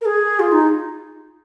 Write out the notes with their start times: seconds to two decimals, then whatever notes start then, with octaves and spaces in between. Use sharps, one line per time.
0.01 A#4
0.06 G#4
0.40 F4
0.52 D#4